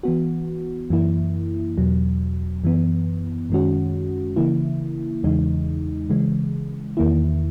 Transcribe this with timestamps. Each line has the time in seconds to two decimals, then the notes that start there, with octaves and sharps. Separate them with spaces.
0.03 E3 B3 F#4
0.90 F#2 E3 A#3 E4
1.78 E2 B2 F#3
2.64 F#2 E3 B3
3.50 F#2 D#3 G#3 C#4 F#4
4.36 C#3 E3 A#3 E4
5.23 E2 C#3 E3 G#3 D#4
6.10 C#3 E3 G#3
6.97 E2 D#3 A#3 E4